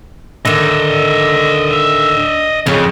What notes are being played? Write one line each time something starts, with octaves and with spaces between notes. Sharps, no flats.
D3 D#3 D#5 E5
F2 C#3